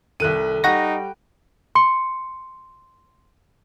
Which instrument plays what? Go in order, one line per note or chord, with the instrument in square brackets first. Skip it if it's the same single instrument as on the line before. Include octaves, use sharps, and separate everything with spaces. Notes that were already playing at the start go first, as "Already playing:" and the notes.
[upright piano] C2 F#6 D#7 [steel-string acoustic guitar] D#3 A4
[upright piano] G3 [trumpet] D#4 [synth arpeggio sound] F#5 C#6 A#6 [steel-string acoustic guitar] G5
[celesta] C6 C#7